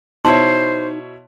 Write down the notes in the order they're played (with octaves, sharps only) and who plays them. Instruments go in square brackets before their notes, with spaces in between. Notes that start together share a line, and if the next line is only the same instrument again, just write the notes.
[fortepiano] B2 E4 C#5 [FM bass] D#4 [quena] C5 [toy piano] A5 C6